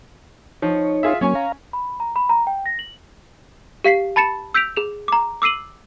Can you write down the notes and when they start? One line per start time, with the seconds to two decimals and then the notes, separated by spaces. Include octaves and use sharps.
0.62 F3 D#4 C#5
1.03 F4 G#4 E5
1.21 F#3 A#3 C#4 C#5 G#5
1.35 F5 A#5
1.73 B5
2.00 A#5
2.16 B5
2.29 A#5
2.47 G5
2.66 A#6
2.79 F#7
3.84 G4 F5 B6 C7
4.16 A5 B5 A6 C#7 E7
4.54 E6 G6 B6 D7 F7
4.76 G#4 F7
5.08 A#5 D6
5.42 D6 E6 C7 D#7 F#7